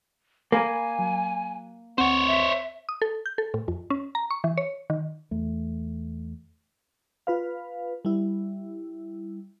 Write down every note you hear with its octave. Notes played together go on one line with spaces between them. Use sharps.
A#3 G#5 B5 G#6
F#3
D2 C4 C5 C#5 F#5
E5
D#6
A4
G6
A4
A2
F2
C#4
A#5
C#6
E3
C#5
D#3
E2 A3
F4 B4 F5
G3 E4